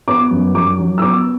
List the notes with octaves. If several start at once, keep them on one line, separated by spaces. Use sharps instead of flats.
B3 D6
F#2
F#2 D6
F#3
E6
B3 D6